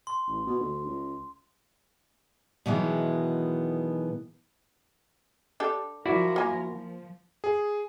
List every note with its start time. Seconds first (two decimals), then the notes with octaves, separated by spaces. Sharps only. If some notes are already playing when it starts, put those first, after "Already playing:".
0.07 C6
0.28 A1
0.47 B2
0.60 D2
0.86 C#2
2.66 B2 D#3 E3 F#3 G#3 B3
5.60 D4 G4 A4
6.06 F3 E4 F#4 A#4 D5
6.36 A#3 G#5
6.73 F3
7.44 G#4